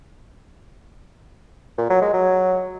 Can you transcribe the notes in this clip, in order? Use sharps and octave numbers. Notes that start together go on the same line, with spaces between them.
A#2
F#3
G#3
F#3